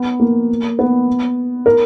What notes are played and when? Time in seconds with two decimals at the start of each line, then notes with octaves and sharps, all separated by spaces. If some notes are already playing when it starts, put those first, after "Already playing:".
Already playing: B3
0.20 A#3
0.79 B3
1.66 A#4